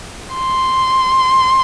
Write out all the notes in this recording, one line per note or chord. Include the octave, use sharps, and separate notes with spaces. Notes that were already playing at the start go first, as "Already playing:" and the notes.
C6